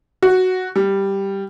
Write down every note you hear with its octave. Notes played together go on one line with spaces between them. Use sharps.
F#4
G3